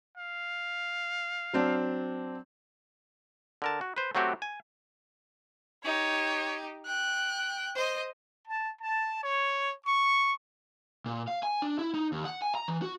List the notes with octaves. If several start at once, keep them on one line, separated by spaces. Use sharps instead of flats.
F5
F#3 C4 D4
D3 A#4 A5
F#4
B4 C5
F#3 A3 C4 F#4 G4
G#5
D#4 G4 C#5
G5 F#6
C5 D#5
A5
A5
C#5
C#6
A#2
F5
G#5
D4
E4
D#4
D#2
F#5
G#5
A#5
E3
F#4